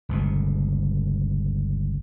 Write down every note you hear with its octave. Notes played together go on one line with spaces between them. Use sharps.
G1 C#2 B2